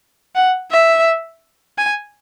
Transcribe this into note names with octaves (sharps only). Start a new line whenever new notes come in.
F#5
E5
G#5